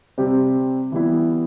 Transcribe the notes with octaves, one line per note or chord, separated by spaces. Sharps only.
C3 G3 C4 G4
E3 G3 B3 E4